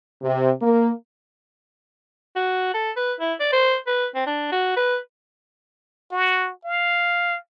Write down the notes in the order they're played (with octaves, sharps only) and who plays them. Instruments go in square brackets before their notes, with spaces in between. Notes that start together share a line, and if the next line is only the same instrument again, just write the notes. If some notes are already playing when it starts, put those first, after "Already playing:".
[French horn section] C3
A#3
[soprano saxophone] F#4
A4
B4
E4
D5
C5
B4
C4
D4
F#4
B4
[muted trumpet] F#4
F5